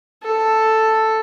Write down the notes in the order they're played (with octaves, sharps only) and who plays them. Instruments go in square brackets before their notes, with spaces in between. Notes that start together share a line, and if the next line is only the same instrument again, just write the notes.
[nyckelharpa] A4